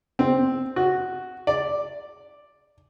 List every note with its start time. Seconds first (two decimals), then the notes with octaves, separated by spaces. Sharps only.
0.19 C4
0.76 F#4
1.47 D5